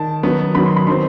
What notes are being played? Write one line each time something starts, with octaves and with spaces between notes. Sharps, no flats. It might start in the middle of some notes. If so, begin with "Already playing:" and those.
Already playing: D#3 A5
D#3 F#3 B3
D#3 F#3 B3 B5
C6
B5
D#3 F#3 C4 C6